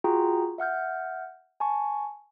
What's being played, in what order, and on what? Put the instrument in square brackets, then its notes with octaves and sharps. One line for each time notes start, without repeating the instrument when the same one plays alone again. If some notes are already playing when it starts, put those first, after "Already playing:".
[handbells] F4 F#4 G#4 G5 A#5
E5 F#5 F6 G6
G#5 A5 C#6